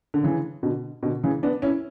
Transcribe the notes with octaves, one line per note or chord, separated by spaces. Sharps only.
D3
C#3 E3
B2 D3
B2 D3
C#3 E3
B3 D4
C#4 E4